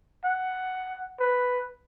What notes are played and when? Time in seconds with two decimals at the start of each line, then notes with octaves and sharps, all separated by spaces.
0.24 F#5
1.20 B4